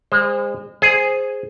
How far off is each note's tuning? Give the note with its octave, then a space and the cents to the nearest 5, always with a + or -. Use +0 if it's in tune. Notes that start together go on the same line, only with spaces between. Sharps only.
G#3 -35 C5 +0
G#4 +0 C5 +0